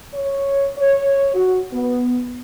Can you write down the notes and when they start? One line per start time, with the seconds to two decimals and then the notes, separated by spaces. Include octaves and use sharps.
0.14 C#5
0.77 C#5
1.34 F#4
1.73 B3